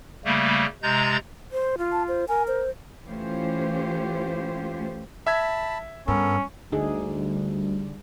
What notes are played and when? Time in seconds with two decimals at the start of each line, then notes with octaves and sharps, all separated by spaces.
0.25 C#3 G3 A3 A#3
0.83 C3 G#3 A#5 G6 A6
1.52 C5
1.78 F4
1.92 A5
2.08 C5
2.28 A#4 G#5
2.48 C5
3.06 E3 A3 C#4 F4 G4 C5
5.27 E5 A5 B5 E6 G#6
6.08 G2 B3 C#4 A4 A#4
6.72 D2 D3 G3 D#4 G#4